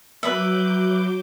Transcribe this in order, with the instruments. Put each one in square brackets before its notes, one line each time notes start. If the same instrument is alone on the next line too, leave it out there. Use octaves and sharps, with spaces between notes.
[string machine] F#3 D6 G6 [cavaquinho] B4 E5